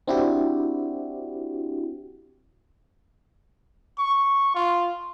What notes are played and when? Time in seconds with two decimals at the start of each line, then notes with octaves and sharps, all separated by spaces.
0.07 C4 D4 E4 F#4 G4
3.98 C#6
4.55 F4